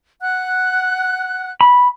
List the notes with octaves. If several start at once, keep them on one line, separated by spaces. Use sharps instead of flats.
F#5 F#6
B5